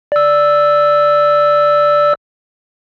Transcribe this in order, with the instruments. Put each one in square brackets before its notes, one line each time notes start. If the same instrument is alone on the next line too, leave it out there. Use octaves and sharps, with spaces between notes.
[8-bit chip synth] D5 E6